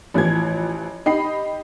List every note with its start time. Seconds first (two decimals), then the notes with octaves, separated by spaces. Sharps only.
0.14 A1 E3 F3 G#6
1.06 D#4 G4 D#5 B5 C7